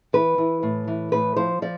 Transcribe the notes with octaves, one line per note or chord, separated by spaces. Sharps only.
E3 B4
E3
A2
E3
A2 B4
F3 C5
F3 D5